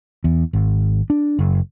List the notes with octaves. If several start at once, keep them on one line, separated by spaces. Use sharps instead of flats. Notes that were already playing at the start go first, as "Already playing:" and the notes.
E2
G#1
D4
F#1